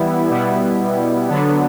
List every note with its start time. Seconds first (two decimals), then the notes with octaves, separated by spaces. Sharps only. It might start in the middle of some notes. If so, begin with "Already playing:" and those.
Already playing: E3 G3 B3 E4
0.30 B2 G3 B3 E4
1.29 D3 F#3 B3 D4